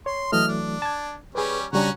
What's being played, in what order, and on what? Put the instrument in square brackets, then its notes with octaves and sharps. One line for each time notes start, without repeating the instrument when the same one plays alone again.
[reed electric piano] C#5 [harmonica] C6
[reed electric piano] E3 F#3 A3 [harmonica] D#5 F6
[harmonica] D4
[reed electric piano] A5 G#6
[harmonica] G3 C#4 [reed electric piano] G#4 B4
[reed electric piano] C#3 G3 D4 [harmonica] C#4 F#4 A#5